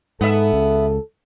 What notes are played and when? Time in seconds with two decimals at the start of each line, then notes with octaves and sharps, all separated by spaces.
0.21 G#2 B3 A4 E5
0.52 C#2 C#3